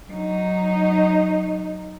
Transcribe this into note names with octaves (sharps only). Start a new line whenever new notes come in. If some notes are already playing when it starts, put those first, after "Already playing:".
F#3 D#4